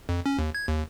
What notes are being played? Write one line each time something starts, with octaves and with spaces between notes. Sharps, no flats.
F2
C#4
D#2
G#6
D#2